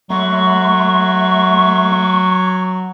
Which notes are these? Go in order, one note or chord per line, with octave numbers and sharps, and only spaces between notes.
F#3 A3 E5 C6 C#6